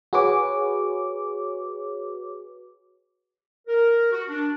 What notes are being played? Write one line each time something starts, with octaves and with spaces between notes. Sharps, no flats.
F#4 G#4 B4 C#5 D6
A#4
F#4
D4